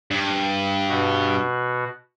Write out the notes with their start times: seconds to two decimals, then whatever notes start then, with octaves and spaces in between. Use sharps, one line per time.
0.11 G2
0.89 B2 F#4